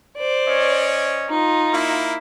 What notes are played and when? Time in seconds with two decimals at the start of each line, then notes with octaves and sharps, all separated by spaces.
0.17 C5 D5
0.47 C#4 C#5 D#5
1.31 D#4 F4
1.73 A#3 E4